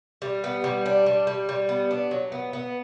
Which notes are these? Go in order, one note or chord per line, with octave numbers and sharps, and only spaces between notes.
G3
B3
G3
D4
G3
G3
G3
B3
D4
F#3
B3
B3